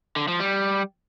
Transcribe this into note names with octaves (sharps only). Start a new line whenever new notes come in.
D3
F3
G3